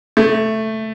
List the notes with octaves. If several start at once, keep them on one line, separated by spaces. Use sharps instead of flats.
A3